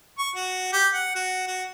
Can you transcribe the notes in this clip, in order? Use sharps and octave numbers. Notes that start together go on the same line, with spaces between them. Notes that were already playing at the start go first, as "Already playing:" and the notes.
C#6
F#4
G4
F#5
F#4
F#4